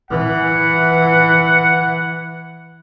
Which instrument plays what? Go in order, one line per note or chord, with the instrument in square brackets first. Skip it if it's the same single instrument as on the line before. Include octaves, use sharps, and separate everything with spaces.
[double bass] E3 [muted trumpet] F#5